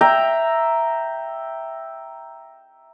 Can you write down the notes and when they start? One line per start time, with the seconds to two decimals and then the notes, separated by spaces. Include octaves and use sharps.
0.01 E5 G5 A#5